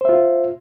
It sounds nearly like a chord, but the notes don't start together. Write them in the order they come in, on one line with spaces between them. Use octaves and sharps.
C5 E5 F4